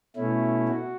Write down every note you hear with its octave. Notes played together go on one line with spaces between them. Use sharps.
B2 A3 C#4 E4
F#4